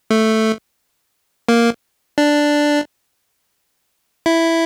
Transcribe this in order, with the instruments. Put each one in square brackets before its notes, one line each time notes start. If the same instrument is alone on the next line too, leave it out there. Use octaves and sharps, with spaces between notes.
[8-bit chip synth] A3
A#3
D4
E4